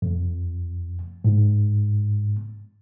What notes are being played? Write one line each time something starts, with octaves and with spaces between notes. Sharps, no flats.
F2
G#2